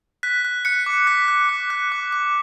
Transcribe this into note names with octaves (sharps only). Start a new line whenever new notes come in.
F#6 B6
F#6
F#6 C#7
D6
F#6 B6
F#6
D6
F#6
D6
D6